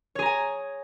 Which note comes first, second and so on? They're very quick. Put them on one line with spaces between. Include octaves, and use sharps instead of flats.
C#5 G#4 A#5 G#5